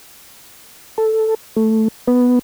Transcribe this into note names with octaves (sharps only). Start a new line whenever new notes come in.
A4
A3
B3